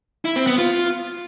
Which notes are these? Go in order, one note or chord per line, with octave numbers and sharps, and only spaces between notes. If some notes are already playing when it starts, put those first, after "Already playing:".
E4
C4
B3
F4